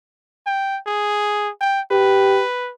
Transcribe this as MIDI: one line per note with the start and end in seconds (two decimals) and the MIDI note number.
0.46 0.79 79
0.87 1.50 68
1.61 1.81 79
1.91 2.43 67
1.91 2.72 71